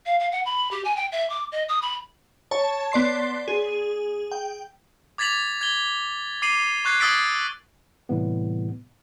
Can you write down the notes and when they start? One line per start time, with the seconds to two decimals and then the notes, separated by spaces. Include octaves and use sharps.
0.06 F5
0.19 F5
0.32 F#5
0.45 B5
0.71 G4
0.85 G#5
0.96 G5
1.12 E5
1.30 D6
1.52 D#5
1.69 D#6
1.82 B5
2.51 C#5 A5
2.92 B3 D5 C6 C7
3.48 G#4
4.32 G5
5.18 D6 G#6 A6 B6 F7 F#7
5.61 G#6 G7
6.42 D6 C7 D#7 F#7
6.85 C#6 F#6 G#6 C7
7.00 D#6 E6 G#6 A6 B6 D7
8.09 A2 C3 E3 G3 B3